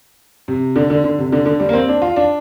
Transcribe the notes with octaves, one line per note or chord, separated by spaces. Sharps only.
C3
D3
D3
D3
C3
D3
D3
G3
A#3
C4
D4
F4
D4